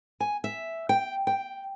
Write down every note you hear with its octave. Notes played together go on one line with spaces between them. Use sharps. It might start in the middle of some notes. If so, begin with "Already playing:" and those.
G#5
E5
G5
G5